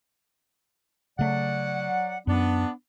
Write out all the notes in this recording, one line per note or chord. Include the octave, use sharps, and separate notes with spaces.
C#3 F#3 A3 D5 F#5
F#2 B3 D4